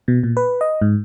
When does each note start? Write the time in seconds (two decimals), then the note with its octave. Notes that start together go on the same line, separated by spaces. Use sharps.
0.08 B2
0.23 A#2
0.37 B4
0.61 D#5
0.81 G#2